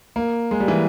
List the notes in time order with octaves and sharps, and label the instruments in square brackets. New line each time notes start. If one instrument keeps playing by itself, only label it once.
[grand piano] A#3
G#3
G3
E3